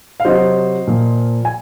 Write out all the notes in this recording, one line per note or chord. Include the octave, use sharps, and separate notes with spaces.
F5
C3 F#3 C5 D#5
A#2 F3
G#5